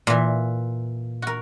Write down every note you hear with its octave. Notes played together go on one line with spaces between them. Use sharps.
A#2 E3
F#4 A#4